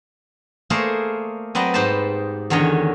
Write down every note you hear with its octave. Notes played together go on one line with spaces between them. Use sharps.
A3 A#3 G#4 A#4 C5 D5
F#3 C4 B4 D5 D#5
G#2 D#4 G4 B4 C5 A5
E2 D3 D#3 C#4 C#5 D#5